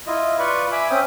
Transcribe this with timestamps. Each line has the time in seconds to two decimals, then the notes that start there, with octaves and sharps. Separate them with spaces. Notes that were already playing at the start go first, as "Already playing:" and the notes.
0.07 E4 F4 D#5
0.39 F4 B4 D5 B5 C#6
0.72 E5 G#5 B5 D6 E6
0.90 C4 C#4 G5 D#6